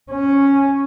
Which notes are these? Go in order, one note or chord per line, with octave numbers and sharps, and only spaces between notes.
C#4